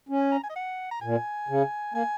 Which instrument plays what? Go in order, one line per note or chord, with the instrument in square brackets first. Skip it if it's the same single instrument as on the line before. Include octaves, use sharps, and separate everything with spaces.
[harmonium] C#4
[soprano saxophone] G#5
A#5
G#5
D#5
F#5
A#5
[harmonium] A#2 [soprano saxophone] G#5
[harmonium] C#3
[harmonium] A#3 [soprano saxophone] G#5